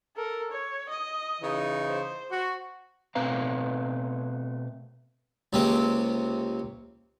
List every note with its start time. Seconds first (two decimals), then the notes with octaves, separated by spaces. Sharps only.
0.16 A4 A#4
0.51 C#5
0.89 D#5
1.42 C#3 E3 D#4
1.89 C5
2.31 F#4
3.15 B2 A3 C4 B4 F5 A#5
5.53 C#2 C3 A#3 C4